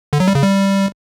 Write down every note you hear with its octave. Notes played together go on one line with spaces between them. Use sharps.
D3
F#3
G3
C#3
G3